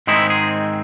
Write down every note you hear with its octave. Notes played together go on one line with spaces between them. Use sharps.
G#2 D#3 G#3 C4 D#4 E4
G#4